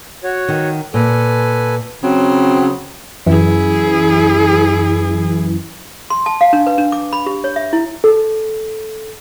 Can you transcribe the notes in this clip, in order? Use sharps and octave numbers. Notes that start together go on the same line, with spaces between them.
F#4 C#5
D#3
A#2 A4 B4 G#5
C#3 F#3 C4
F#2 E3 E4 G#4
C6
A5
F5
D4
B4
D4
D6
B5
G4
C#5
E5
E4
A4